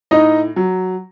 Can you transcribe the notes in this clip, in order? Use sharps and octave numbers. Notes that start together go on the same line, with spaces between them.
A2 D#4 D#5
F#3